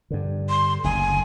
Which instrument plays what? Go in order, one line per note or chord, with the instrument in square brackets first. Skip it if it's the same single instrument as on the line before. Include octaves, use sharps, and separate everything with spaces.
[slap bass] G2 D3
[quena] C6
[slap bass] F#1 D2 [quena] G#5